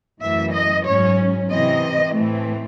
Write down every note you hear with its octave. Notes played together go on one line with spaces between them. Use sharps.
F#2 E3 A3 E5
D#5
G#2 F#3 C#4 C#5
C3 E3 C4 D#5
A2 E3 A3 C4